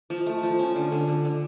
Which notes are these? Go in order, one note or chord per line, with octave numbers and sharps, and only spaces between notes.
F3
A3
F3
C#4
D3
D3
D3
D3